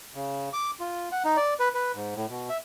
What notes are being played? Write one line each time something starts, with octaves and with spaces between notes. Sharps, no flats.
C#3
D6
F4
F#5
D#4
D5
B4
B4
G#2
A2
B2
E5